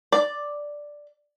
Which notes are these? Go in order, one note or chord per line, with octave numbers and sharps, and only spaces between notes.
D5